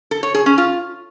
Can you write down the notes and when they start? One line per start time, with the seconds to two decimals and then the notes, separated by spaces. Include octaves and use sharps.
0.11 A4
0.23 C#5
0.34 G#4
0.46 C#4
0.58 F4